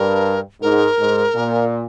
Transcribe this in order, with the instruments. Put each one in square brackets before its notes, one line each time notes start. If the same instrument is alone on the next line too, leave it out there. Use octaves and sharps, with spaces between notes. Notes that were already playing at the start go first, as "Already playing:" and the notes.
Already playing: [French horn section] G2 [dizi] A#4
[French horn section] G#2 [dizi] A#4
[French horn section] G#2
A#2